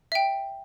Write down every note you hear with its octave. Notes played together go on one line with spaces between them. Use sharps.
E5 G5